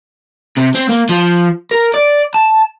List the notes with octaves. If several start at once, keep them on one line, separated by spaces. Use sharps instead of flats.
C3
C4
A#3
F3
A#4
D5
A5